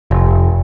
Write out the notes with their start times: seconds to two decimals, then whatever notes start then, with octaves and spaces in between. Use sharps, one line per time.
0.11 F1